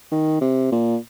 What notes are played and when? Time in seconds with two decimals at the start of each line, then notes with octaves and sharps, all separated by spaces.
0.12 D#3
0.41 C3
0.72 A#2